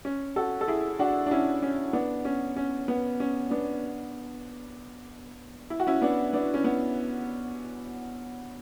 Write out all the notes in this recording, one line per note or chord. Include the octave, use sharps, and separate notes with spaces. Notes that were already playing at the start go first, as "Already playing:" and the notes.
C#4
F#4 A4
A4
E4 G#4
D4 F#4
D4
C#4 E4
C#4
B3 D4
C#4
C#4
B3
C#4
B3 D4
E4
F#4
C#4 E4
B3 D4
B3 D4
C#4
B3